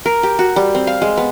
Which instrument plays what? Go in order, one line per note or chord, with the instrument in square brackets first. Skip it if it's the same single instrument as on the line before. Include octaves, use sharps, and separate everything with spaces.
[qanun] A#4
G4
F#4
G3
C4
F5
G#3
B3